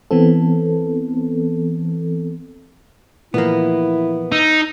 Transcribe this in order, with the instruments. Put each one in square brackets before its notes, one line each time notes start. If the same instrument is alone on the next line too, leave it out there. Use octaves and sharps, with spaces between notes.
[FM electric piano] E3 B3 C4 A4
[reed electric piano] A#2 E3 F3 [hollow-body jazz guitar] A#3 B3 [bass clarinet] E4
[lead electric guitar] D#4 [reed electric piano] E6